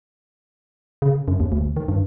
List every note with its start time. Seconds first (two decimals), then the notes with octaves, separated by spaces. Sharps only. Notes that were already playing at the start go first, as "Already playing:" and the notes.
1.02 C#3
1.28 F#2
1.40 D#2
1.52 D2
1.77 D#3
1.88 G2